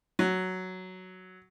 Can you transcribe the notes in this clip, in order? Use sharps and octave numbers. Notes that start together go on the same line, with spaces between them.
F#3